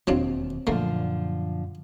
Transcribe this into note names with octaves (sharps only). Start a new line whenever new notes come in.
E1 D#2 F#3 C4 D4 F4
F#2 A#2 D3 F3 A3 A#3